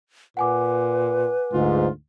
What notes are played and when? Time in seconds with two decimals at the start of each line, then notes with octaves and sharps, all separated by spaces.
0.37 A#2 B4 F#5 G#5 D6
1.53 D2 G#2 F4